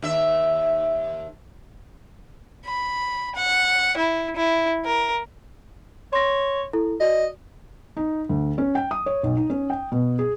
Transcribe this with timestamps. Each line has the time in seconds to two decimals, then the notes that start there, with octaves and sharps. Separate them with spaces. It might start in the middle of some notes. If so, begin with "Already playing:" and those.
0.02 D#2 E5
2.65 B5
3.35 F#5
3.97 E4
4.36 E4
4.85 A#4
6.13 C#5 C6 A#6
6.73 E4 A4
7.01 F#4 D5 D#5
7.97 D#4
8.29 D2
8.58 C#4
8.75 G5
8.91 D#6
9.06 C#5
9.23 B1
9.37 D#4
9.50 C#4
9.70 G5
9.92 B2
10.19 G#4